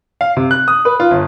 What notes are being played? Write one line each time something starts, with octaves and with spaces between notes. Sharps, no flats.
F5
C3
F#6
D#6
B4
F4
G1